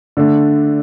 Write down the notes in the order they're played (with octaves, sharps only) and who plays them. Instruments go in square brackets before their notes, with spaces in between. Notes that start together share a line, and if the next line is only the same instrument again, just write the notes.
[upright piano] D3 A3 D4